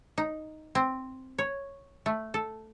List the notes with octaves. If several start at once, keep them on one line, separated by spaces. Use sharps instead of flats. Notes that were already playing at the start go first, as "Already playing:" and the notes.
D#4
C4
C#5
A3
A4